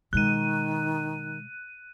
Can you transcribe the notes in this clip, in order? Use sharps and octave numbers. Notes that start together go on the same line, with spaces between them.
B2 D#3 G#3 F#6 D#7